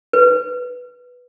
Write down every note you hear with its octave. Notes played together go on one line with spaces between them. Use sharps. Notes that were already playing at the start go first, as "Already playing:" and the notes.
B4